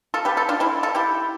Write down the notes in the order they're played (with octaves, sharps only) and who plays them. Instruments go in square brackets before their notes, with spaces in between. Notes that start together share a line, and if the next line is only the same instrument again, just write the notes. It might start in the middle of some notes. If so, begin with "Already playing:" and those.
[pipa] F4 A4
G4 B4
F4 A4
D4 F4
C4 E4
F4 A4
E4 G4